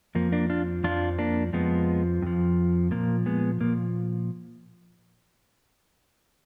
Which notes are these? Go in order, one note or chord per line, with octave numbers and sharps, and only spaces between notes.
F2 F3 A#3
A#3 D4
D4 F4
F2 F3 D4 F4
A#3 D4
F2 F3 G#3 B3
F2 F3
A#2 F3 A#3
G#3 B3
A#2 F3 A#3